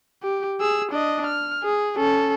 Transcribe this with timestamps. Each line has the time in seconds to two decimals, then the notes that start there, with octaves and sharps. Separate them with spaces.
0.23 G4
0.60 G#4 E6
0.92 D4 D#5
1.26 F6
1.63 G#4
1.97 C#4 A4